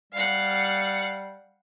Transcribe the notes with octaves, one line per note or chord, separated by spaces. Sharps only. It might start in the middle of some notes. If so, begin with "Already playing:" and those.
G3 F5 F#5